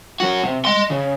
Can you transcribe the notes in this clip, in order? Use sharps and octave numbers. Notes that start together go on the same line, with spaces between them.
F#2 F#4
C3
D#5 C6
C#3